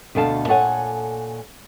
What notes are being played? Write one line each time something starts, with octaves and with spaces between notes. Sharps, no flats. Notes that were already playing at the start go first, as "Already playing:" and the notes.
D2 B2 A4 F5 A5
A#2 A4 C#5 F#5 G#5